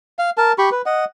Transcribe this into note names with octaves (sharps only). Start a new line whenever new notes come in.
F5
A#4 A5
G4 B5 C#6
B4
D#5 F#5